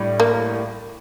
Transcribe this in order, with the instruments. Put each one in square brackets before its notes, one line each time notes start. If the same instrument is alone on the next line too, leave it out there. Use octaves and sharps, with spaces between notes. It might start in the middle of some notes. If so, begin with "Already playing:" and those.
Already playing: [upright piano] A2 G3 D4
[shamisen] A#3